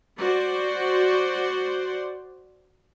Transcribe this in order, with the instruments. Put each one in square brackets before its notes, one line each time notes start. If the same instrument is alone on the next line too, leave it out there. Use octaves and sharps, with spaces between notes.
[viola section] F#4 C5 D5